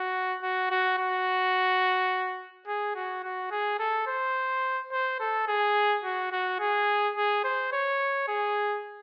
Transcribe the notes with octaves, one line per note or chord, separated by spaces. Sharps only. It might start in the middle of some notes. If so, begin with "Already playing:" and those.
Already playing: F#4
F#4
F#4
F#4
G#4
F#4
F#4
G#4
A4
C5
C5
A4
G#4
F#4
F#4
G#4
G#4
C5
C#5
G#4